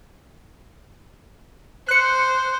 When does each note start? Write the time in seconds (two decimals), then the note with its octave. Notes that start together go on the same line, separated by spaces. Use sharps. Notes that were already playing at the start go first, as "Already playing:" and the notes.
1.89 C5 F#6 C#7